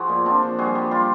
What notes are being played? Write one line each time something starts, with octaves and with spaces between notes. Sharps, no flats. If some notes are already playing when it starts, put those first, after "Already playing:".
Already playing: F3 F#4 G#4
A#2
F3 C4 D4
F3
G3 F#4 G#4
G3
G3 F4 G4